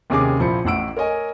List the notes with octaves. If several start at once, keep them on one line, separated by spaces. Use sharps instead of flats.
D#2 C3 C#4 G#4 D6
A#1 F3 E4 C5 B5 C#7
A1 A2 F#5 E6 D7
A#4 C#5 D#5 G#5